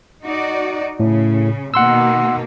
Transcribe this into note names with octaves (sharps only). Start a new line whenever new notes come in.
D#4 F#4 D5
A2 C#3
B2 D#3 A#3 F#5 C6 E6